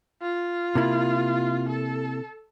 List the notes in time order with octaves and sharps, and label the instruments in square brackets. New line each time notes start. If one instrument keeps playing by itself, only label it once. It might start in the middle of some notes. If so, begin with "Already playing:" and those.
[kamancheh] F4
[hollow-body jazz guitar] C3 A#3 E4
[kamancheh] A4